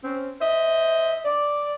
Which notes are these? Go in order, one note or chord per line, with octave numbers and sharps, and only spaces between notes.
C4 C#4
C5 D#5 E5
D5